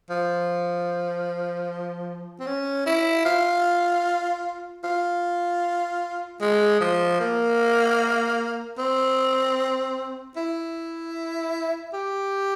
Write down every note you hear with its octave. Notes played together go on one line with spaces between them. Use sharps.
F3
C4
C#4
E4
F4
F4
G#3
F3
A#3
C4
E4
G4